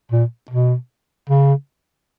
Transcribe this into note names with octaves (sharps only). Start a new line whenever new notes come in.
A#2
B2
C#3